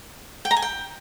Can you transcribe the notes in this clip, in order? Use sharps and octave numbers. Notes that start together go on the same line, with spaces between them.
G5
A#5
G#5
G5